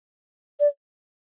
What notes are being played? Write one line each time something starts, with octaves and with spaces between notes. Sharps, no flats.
D5